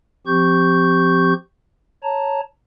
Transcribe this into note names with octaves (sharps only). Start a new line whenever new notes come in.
F3 C4 G4 C#6 G6
C#5 A5 A#5